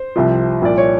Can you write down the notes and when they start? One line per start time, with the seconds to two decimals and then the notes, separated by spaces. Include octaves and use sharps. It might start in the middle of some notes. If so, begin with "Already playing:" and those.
Already playing: C5
0.16 C2 C3 F3
0.62 C2 A#2 F3 D5
0.78 C#5